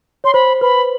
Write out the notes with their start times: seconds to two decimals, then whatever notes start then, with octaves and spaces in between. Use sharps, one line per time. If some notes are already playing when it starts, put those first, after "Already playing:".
0.24 C#5 C6
0.34 C5 B5
0.61 B4 B5